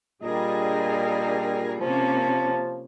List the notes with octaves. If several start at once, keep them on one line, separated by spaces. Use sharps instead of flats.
A#2 G3 D4 G#4 A#4 D#5
C3 F3 A#3 C#4 A5